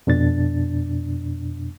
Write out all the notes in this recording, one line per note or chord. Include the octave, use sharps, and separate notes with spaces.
F2 B2 D4 A6